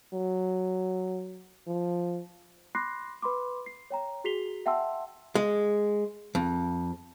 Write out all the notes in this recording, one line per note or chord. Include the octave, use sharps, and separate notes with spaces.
F#3
F3
B5 C6 D6 F#6 A#6 C7
B4 B5 C6 D6
C7
C#5 G5 A#5
F#4 G#4 B6 C7 F7 G7
E5 F#5 G5 A5 C6 E6
G#3
F2